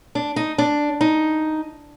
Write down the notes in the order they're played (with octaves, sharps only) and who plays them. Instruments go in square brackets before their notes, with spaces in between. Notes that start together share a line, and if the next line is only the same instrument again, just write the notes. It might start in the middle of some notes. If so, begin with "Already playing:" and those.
[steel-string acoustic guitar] D4
D#4
D4
D#4